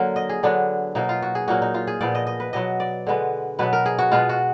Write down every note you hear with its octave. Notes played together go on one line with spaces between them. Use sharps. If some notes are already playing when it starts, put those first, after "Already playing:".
Already playing: D3 F#3 A#3
D#5
G#4
D3 F#3 B3 D4
B2 F#3 A#3 D#4
F4
F#4
G#4
A#2 F#3 A#3 F#4
D#4
F4
G#4
A#2 F3 B3 D5
D#5
D#5
B4
B2 F#3 B3 D#5
D5
D3 G#3 B3
B2 F#3 B3 B4
A#4
G#4
F#4
B2 G#3 B3 F4
F#4